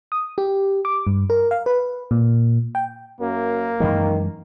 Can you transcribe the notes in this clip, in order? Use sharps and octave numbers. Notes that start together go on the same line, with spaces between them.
D#6
G4
D6
G2
A#4
F5
B4
A#2
G5
F#2 A#3
F#2 D#3 E3 G#3